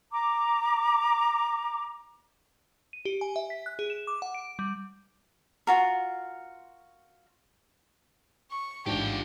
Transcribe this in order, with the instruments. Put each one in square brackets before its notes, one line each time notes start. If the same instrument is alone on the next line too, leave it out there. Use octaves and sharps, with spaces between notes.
[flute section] A#5 D6
[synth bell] D#7
G4
G#5
E5
B6
F#6
G#4
E7
D6
F#5
D7
G3
[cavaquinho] F4 F#4 A#4
[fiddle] C#6
[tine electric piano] A1 G#2 [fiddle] D4 G5 [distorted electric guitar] F4 G4